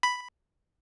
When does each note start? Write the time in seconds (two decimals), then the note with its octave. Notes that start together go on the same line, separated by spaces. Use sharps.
0.03 B5